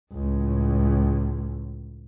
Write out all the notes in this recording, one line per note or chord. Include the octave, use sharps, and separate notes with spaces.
C#2 A2